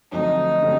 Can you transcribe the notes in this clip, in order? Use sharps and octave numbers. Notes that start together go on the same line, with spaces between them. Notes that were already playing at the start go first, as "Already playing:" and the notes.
F2 D3 F#3 A3 C4 D#4
D3 F#3 A3 C4